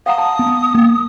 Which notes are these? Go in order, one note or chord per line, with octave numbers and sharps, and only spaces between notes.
F5 F#5 A#5 D#6
A5
B3
A#3